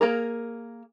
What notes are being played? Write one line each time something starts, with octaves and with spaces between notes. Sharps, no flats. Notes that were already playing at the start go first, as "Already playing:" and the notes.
A#3 G#4 A#4